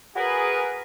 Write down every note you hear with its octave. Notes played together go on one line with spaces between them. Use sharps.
F#4 G#4 A#4 B4